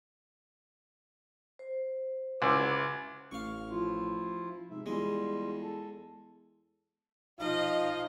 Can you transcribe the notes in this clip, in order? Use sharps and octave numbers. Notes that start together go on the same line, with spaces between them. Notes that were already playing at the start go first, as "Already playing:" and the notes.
C5
C#2 E4 F#4 D6
A1 F5 C#6
F3 E4 F4
G#2 C3 E5
E2 G3 G#3 F4
A4
F3 D#4 D#5 F5